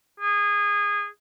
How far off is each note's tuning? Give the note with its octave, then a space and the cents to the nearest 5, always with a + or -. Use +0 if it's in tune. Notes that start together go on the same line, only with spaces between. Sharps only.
G#4 -20